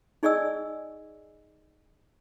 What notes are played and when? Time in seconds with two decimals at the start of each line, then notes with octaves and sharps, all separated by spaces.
0.23 D#4 G#4 D5 D#5 G#5 E6